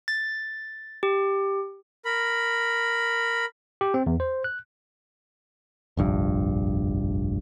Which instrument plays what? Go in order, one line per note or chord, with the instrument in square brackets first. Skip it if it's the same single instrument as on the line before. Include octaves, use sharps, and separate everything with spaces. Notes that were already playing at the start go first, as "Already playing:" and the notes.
[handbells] A6
G4
[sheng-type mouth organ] A#4 B5
[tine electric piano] G4
C4
E2
C5
F#6
[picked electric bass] F1 A#1 G2